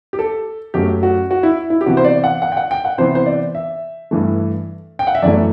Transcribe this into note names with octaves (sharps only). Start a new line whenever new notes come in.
G4
A4
F#2 F#3 A3 G4
F#4
F#4
E4
E4
G4
C3 E3 B3 F#4
C5
D5
F#5
F#5
G5
F#5
G5
F#5
C3 E3 B3 C5
C5
D5
E5
G2 E3 A3
G5
F#5
E5
F#2 E3 A3 D5